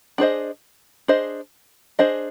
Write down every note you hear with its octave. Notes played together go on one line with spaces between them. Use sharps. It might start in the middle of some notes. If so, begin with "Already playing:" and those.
D4 G#4 C5 D#5
D4 G#4 C5 D#5
D4 G#4 C5 D#5